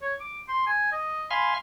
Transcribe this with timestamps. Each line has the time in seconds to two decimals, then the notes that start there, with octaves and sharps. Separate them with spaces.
0.02 C#5
0.20 D6
0.48 C6
0.67 G#5
0.92 D#5
1.31 F5 G#5 B5 C6